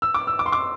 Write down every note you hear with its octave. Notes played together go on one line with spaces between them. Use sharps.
E6
D6
E6
D6
C6
D6